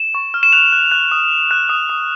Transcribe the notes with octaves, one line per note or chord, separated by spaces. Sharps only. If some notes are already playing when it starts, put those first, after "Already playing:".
Already playing: E7
C#6
F6
E7
F#6 F7
F#6
F#6
D#6
D#6
F#6
D#6
D#6